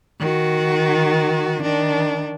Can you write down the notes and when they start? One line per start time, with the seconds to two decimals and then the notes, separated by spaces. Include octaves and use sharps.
0.20 D#3 F#4
1.62 D#3 D4